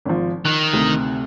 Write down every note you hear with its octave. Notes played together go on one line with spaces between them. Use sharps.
G#1 F3
D#3 F#6
D2 C3